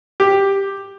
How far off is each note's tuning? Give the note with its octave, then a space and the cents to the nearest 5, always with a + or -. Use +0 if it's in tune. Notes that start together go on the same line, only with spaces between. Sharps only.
G4 +5